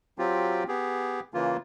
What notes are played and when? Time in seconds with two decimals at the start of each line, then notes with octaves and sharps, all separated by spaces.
0.19 F#3 C4 F4 G4
0.68 B3 G4 G#4
1.34 C#3 E3 A#3 F4